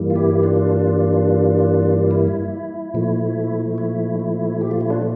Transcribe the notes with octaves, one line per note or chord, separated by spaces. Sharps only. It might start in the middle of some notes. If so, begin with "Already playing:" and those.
Already playing: G2 E3 G3 A#3
F4
E4 G4
D4 F4
E4
A#2 F3 A3
E4
E4
G4
F4
E4
D4 F4